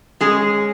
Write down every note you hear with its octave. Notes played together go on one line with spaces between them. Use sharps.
G#3 C#4 G#4